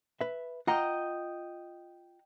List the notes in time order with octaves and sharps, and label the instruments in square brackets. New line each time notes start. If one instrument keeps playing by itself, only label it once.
[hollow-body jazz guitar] B4 E5
[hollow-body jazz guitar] F4 F#5 A#5 [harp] D#5 G5 D#6